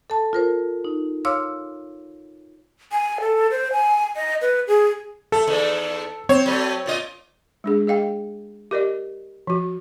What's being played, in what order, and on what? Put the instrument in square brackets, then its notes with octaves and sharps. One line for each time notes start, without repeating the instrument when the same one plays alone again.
[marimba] A4 A5
F4 A#4 C5
D#4
C#5 F5 C6 D6 E6 F6
[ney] G#5
A4
C5
G#5
D#5
B4
G#4
[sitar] A3 [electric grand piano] A4
[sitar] E2 D#3
[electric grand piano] C4 C#5 [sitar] C5
[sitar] F#3 A3
A#2 F4 D#5
[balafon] G#3 D4 G#4
G#4 D#5 F5 G5
G4 A#4 D5 D#5
F3 F#4